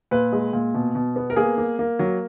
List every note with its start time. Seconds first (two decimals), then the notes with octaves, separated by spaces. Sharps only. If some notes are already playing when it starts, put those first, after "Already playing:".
0.11 A#2 B4
0.32 G#3
0.53 A#2
0.74 B2
0.95 B2
1.16 B3
1.30 A#4
1.36 A#3 G#4
1.58 A#3
1.79 A#3
1.99 F#3